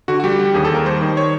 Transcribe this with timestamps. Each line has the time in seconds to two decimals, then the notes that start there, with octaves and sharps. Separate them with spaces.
0.08 D3 F#4
0.20 F#4
0.24 G3 G4
0.40 G3
0.54 D#2 G#4
0.65 A4
0.70 D#2 A#4
0.85 G3 C5
1.01 D#3
1.17 C#5